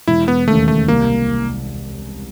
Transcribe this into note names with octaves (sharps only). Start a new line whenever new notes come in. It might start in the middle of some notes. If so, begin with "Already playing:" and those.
E1 E4
B3
D#2 C#3 A3
A3
C2 A#3